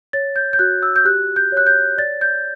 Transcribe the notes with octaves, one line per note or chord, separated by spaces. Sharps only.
C#5 A6
G6
G6
F#4 F#6
E6
G6
G4 F#6
G6
C#5 F#6
G6
D5 A6
G6